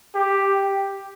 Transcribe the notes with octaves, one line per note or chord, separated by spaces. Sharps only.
G4